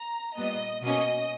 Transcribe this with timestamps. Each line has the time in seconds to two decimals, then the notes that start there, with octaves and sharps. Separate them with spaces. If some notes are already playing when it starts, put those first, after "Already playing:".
Already playing: A#5
0.37 A#2 G3 B3 D#5
0.83 B2 A#3 C#4 D#5